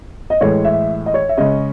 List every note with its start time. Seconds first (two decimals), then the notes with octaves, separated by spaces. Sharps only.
0.30 D#5
0.41 A2 E3 G#3 C#5
0.65 E5
1.06 D#5
1.14 C#5
1.29 E5
1.37 C#3 G#3 C#4 D#5